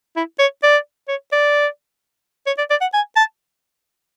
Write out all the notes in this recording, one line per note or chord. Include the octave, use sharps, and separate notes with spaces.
E4
C#5
D5
C#5
D5
C#5
D5
D5
F#5
G#5
A5